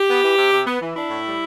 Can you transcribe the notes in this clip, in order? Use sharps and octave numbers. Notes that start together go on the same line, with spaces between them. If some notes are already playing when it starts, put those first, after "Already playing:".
Already playing: G4
B3
E3
C3
C3
B3
E3
D4 E4
A2
G3